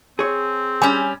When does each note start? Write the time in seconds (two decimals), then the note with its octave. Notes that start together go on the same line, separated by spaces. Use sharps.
0.19 C4 G#4 C#5
0.82 G3 C#4 G#5